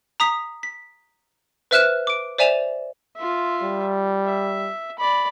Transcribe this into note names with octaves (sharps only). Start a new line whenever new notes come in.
A#5 D#6 B6
B6
B4 C5 E5 F6 F#6 E7
D6 D7
C5 D5 E5 G#5 E7 F7
F4 E5
G3
E5
D5 B5